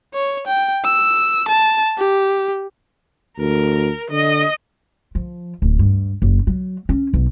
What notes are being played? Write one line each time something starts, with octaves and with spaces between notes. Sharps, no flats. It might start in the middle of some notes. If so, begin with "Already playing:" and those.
C#5
G5
E6
A5
G4
D2 A#4
D3 D#5
F3
D1
G2
F#1
F#3
C#4
B1